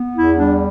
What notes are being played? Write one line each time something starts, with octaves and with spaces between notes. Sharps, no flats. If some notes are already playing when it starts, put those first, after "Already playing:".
Already playing: B3
E2 E4
G3 D4